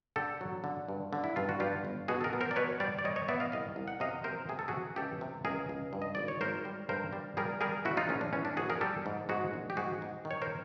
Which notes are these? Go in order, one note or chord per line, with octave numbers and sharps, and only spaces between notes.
D3 G4 A4
F#3
D3
G2
D3
E4
G2 F4
F#4
G2 F4 G4
G1
B2 F#4 G#4
A4
G#4 A#4
B3
A#4 C5
D5
B2 B4 C#5
G3 C5 D5
D5
G3 C#5 D#5
C#5 D#5
B3 D5 E5
D#5 F5
C2 D#5 F5
C2
F#5
C3 D#5 F5
C3 A#4 C5
C3 G#4
A4
F#4 G#4
C3
C#2 G4 A4
C3
C#2 G#4 A#4
C#2
G2
D#5
G#1 D5
C#5
G#1 A#4 C5
G3
G2 A#4 C5
G3
G3 G#4 A#4
G3 G#4 A#4
A#1 E4 F#4
D#4 F4
A#1 C#4
D4
E3 C#4
D4
A#1 F#4 G#4
G#4 A#4
G3 G4 A4
G#2
G#2 F#4 G#4
A#1
G4
G#2 F#4 G#4
G#2
D#3
C#5
A#4 C5